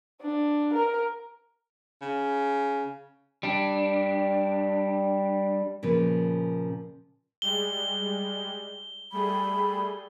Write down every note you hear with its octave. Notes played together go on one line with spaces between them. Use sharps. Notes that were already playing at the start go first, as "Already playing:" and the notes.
D4
A#4
C#3
G3 D4
A#2 C#3 F3 B4
G3 G#3 G7
G3 A3 G#4 B5